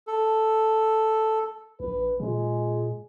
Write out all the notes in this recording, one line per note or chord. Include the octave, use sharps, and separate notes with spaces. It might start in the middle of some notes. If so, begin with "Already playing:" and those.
A4
A#1 B4
A#2 G#3